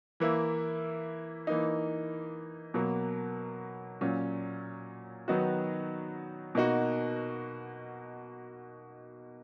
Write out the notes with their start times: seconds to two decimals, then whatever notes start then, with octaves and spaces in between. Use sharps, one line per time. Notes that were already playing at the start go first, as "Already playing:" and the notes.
0.20 E3 A#3 E4
1.47 E3 A#3 D#4
2.74 B2 F#3 A#3
4.01 A#2 F#3 C#4
5.28 D#3 F#3 B3 D#4 F#4
6.55 B2 A#3 D#4 F#4